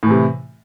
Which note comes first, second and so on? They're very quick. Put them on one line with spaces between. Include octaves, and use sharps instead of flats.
A2 E3 C3